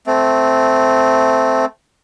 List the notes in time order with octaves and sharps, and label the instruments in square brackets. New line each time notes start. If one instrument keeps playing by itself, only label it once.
[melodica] A3 C4